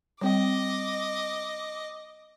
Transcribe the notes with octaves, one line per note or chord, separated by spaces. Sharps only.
G3 C4 D#5 G5 D6